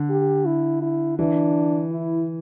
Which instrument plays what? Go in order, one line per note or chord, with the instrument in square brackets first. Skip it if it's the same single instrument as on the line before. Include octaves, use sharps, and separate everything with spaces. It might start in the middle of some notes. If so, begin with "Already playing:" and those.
Already playing: [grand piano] D3
[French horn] G4
E4
E4
[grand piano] E3 [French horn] D4
[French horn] E4